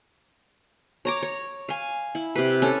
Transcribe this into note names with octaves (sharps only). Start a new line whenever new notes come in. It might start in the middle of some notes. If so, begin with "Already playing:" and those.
C#5 A#5 D6
C#5
F5 G#5
E4
C3 B4
C#4 A4